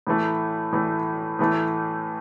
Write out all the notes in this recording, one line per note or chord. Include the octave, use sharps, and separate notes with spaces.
A2 E3 A3
A2 E3 A3
A2 E3 A3